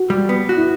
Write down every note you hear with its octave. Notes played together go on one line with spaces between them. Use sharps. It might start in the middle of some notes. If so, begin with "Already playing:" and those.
Already playing: F#4
G3
B3
F#4
E4